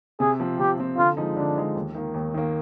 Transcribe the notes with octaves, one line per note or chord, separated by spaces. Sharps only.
C3 G#4
F3 C4
C3 G4
F3 C4
D3 F4
F3 G#3 D#4
D3 D4
F3 G#3 D#4
D#2
D#3 A#3
D#2
D#3 A#3